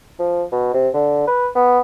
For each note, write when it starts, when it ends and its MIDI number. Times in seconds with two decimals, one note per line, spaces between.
0.19 0.43 53
0.52 0.70 47
0.74 0.89 48
0.94 1.27 50
1.27 1.49 71
1.56 1.80 59